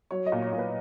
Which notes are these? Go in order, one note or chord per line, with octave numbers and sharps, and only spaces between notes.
F#3 C#5
D#5
A#2
C#5
A#2
B4